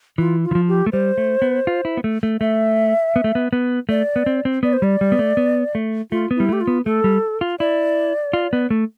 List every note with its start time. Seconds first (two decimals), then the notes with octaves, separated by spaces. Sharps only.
0.18 E3 F4
0.44 F4
0.51 E3
0.55 F3
0.68 G4
0.86 A3
0.92 G3 C5
1.18 A3
1.42 B3
1.67 F4
1.85 E4
1.97 B3
2.04 A3
2.23 A3
2.40 A3 E5
3.16 B3
3.24 A3
3.35 B3
3.53 B3
3.89 A3 D5
4.16 B3
4.26 C4
4.45 C4
4.63 B3 D5
4.73 C5
4.82 G3 D5
5.01 G3
5.12 B3
5.19 A3
5.37 B3
5.75 A3
6.11 A3 F4
6.31 B3
6.36 G3 E4
6.49 A3 G4
6.61 F4
6.67 B3
6.85 A3 A4
7.04 G3
7.41 F4
7.60 E4 D5
8.33 F4
8.53 B3
8.70 A3